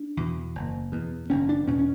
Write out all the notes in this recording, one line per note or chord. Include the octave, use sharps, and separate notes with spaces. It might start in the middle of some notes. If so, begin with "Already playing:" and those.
Already playing: D4
E2 B2
F#1
E2 B2
F#1 C#4
D4
E2 B2 C#4
C#4